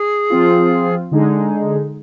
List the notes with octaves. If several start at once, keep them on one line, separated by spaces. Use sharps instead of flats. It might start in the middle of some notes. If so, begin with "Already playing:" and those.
Already playing: G#4
F3 C4 F4
D3 G#3 D#4 G#4